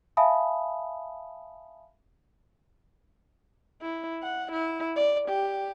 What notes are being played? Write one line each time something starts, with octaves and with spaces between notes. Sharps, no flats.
E5 F5 G#5 A5 B5 D#6
E4
F#5
E4
D5
G4